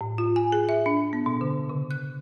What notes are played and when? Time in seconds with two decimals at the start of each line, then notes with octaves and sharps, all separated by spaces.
0.01 A2
0.18 F4
0.36 G#5
0.52 G#4
0.69 E5
0.86 D4
1.13 B3
1.26 B2
1.41 D3
1.69 C#3
1.91 F#6